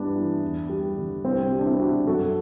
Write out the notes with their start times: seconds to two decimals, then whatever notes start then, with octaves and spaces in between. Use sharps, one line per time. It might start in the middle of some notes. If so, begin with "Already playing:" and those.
Already playing: G2 E3 G3 B3 D4
0.15 E3
0.42 E2
0.69 G3
0.97 D3
1.24 C2 C4
1.51 G3 E4
1.59 D4
1.66 C4 E4
1.79 B2 D4 F#4
2.07 F#2 F#4 A4